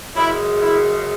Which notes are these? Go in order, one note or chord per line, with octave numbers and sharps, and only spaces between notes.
F#2 C#3 G#3 E4
E4